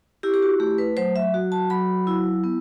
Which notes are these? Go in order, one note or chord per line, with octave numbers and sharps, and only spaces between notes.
E4 G4
G4
F#4
A3 G4
B4
F#3 C5
E5
F#4
A5
F#3 B5
E4
B3